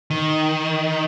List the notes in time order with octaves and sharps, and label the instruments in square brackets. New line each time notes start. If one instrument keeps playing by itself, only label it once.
[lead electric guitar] D#3